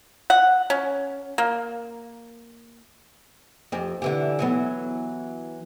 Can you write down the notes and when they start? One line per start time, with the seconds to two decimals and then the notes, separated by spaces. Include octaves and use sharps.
0.30 F#5
0.70 C#4
1.38 A#3
3.72 F2 G4
4.02 D3 E3 G4
4.39 E3 F#3 B3